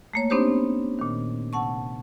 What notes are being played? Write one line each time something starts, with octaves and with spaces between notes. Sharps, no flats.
A3 A#3 C#5
B3 C4 D4 D#4 G4 C5
A#2 D#3
C3 F#5 A5 C#6